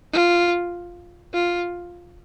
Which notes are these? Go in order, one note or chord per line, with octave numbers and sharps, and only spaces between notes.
F4
F4